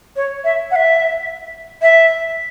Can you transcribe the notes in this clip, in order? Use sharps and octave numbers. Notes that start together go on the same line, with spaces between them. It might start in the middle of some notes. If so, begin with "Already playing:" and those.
C#5
E5
F#5
E5
E5